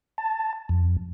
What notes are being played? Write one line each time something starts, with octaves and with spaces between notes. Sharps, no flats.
A5
F2